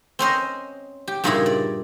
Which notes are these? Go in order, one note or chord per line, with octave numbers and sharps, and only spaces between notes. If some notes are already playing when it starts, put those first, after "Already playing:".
C4 C#4 C5 D#5
G4
G2 A#2 C#3 D#4 E4 G#4
D5